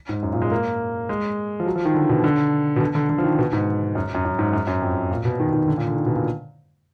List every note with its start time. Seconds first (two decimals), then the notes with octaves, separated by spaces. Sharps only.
0.09 G#2
0.23 F#2
0.33 A#2
0.42 G#3
0.52 A#3
1.09 G#3
1.60 F3
1.66 F#3
1.76 F3
1.85 D#3
1.95 D3
2.09 B2
2.24 D3
2.76 B2
2.81 D3
2.95 D3
3.10 D3
3.18 F3
3.24 D#3
3.38 B2
3.53 G#2
3.95 F#2
4.15 F#2
4.25 F#2
4.39 G#2
4.53 F#2
4.67 F#2
4.82 F2
5.11 A#2
5.25 B2
5.40 D#3
5.53 D#3
5.68 D3
5.77 A#2
5.87 D3
5.97 D#3
6.06 B2
6.16 A#2